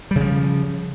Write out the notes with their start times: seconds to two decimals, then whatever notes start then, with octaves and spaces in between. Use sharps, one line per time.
0.11 G3
0.16 C#3
0.20 F3